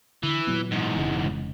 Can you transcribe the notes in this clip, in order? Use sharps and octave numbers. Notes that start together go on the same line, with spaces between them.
D3 E3
A#2 F#3 B3
E2 G#2
F1 C#3 G#3